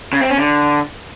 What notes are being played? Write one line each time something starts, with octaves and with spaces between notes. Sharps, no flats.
C#3
C4
C#4
D3